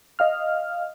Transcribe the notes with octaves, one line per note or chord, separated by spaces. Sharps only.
D#5 F5 F6